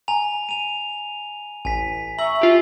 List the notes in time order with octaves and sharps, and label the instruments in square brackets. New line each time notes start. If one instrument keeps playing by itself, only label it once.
[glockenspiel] G#5 A#5 F7
D#7 F7
[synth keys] A1 [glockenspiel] G#5 B6
[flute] E5 [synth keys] A#5 C#6 [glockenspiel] E6 F#7
[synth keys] F4 G4